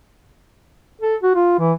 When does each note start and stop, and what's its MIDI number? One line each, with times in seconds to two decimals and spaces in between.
1.02 1.15 69
1.23 1.33 66
1.35 1.55 65
1.59 1.73 52